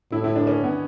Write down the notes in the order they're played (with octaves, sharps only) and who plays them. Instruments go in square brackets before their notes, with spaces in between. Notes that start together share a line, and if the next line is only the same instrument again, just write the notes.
[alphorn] A2 [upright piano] E4
[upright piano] E4
D4
C#4
B3